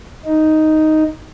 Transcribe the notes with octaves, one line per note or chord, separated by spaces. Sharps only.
D#4